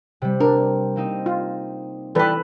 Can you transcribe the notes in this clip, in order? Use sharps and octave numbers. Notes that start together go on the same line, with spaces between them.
C3 G3
D4 A#4
A#3 C4 D#4
F4
E3 G3 G4 A4 B4